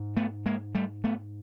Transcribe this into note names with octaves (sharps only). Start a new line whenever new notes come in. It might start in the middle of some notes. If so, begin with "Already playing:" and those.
Already playing: G#2
A3 B3
G#3 A#3
G3 A3
A3 B3